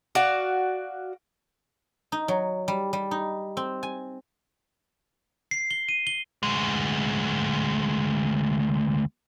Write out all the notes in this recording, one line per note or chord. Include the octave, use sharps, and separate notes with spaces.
F#4 D5 F5
D#4
F#3
G3
G3
D#4
C4
G#5
C7
G7
D#7
G7
D2 G#3